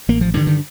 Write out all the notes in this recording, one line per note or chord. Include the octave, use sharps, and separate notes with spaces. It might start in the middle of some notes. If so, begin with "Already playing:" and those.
A1 A#3
F3
G2 D3 D#3
D#3